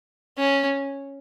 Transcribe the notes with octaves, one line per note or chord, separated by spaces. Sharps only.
C#4